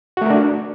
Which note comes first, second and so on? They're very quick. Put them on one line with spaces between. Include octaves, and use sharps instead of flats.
F#4 A3 A#4 D4